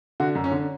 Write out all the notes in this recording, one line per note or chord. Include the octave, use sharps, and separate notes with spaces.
D3 F#4
F#2
C#4
D3